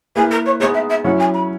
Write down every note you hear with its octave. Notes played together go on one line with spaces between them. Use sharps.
A#3 E4 G#4 B4
A#4
C#5
G#3 B3 D#4 G#4 C#5
E5
E5
F#3 C#4 E4 F#5
G#5
B5